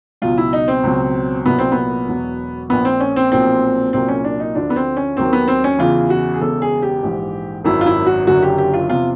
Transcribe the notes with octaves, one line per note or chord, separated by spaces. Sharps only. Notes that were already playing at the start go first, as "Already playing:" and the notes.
C#2 B2 F#3 F4
E4
D#4
C4
C#2 B2 F#3
C2 A#2 F#3 B3
C4
B3
E1 E2 B2 F#3
A#1 A#2 F3 B3
C4
C#4
C4
B1 A#2 F3 C4
C2 A#2 F#3 C4
C#4
D4
D#4
D2 D3 F3 D4
B3
C4
C#4
D#2 D#3 F#3 C4
B3
C4
C#4
E2 C#3 E3 F4
F#4
G#4
E1 E2 C#3 A4
G#4
G4
A#1 G#2 E3
G#1 F#2 D#3 F#3 E4
F4
E4
F#4
F#1 F#2 D3 F#3 F#4
G4
G4
F4
E2 C3 F3 F4